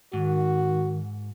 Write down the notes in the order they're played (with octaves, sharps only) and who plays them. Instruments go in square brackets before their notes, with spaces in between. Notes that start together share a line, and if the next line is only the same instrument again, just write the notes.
[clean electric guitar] G#2 [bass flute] D#3 [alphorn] F#4